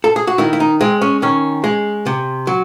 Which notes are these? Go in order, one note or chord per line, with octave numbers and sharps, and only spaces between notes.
A4
G#4
F#4
D#3 E4
E4
D#4
G#3 C4
C#4
D#3 C#4
G#3
C3
F#3